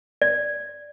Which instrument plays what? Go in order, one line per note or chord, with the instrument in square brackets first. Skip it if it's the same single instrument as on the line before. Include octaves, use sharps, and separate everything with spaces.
[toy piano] D5